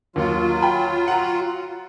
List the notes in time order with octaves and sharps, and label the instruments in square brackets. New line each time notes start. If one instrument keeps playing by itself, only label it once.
[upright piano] D#2 [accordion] F#3 F4
[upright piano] G5 B5
F#5 A#5